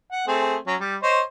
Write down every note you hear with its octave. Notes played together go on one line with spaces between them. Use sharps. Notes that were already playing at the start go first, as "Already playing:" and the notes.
F#5
A3 C4 G#4
F#3 C#4
G3
C5 C#5 D#5